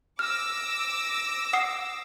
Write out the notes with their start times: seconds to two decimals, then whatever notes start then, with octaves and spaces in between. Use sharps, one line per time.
0.19 D6 E6 F6 A#6
1.53 F#5 D#6 C7